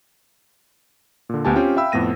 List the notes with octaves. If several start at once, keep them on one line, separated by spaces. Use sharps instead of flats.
A#2 D3
D2 B3 G4 G#5 A5
C4 C#4 F4 G4 G5
E5 F5 G5 B5 E6
F2 A2 B3 A#6 D#7